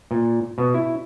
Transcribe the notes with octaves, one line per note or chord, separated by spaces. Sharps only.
A#2
B2
E4